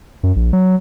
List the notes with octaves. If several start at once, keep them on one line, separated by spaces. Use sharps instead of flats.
F#2
A#1
F#3